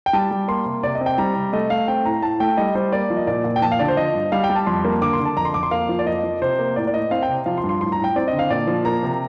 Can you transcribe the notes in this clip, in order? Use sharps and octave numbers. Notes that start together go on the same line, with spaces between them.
G5
G3 A5
G3
A#3 C6
C3
C3 D5
D#5
C4
G5
G3 A#5
C3
A3 D#5
A3 F5
C4 G5
A2 A#5
A2 A5
A3 G5
G3 D#5
G3 C5
A#3 D5
F3
D#5
A#2 D5
A#2
G5
F3 A5
F5
D3 D5
C5
F3 D#5
G2
G3 F5
G5
G3
A5
F2 C6
A#3
D3 D6
C6
D3
A5
F2 A#5
C6
F2 D6
C6
A#3 F5
F3
D5
F2 D#5
F3
C3 C5
A#3
A2 D5
D5
A2 D#5
C4 F5
G5
C3
F3 F5
C6
G2
C6
A2 C6
A#5
A2
G5
C4 D5
D#5
D3
F5
A#2 D5
F3
A#3 A#5
C3